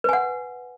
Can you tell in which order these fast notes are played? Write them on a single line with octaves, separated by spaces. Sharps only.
B4 G#5 F#5